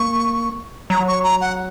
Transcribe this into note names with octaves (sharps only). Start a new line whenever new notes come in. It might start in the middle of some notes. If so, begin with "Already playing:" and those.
Already playing: A#3 C#6
F#3 A#5
C#6
A#5
F#5